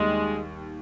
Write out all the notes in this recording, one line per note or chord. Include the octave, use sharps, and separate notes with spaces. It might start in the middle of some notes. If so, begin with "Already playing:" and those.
Already playing: D#2 D#3 G3 G#3